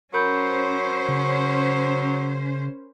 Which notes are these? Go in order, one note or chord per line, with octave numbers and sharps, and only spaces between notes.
F#3 C#4 A#4 C5 B5 G6
C#3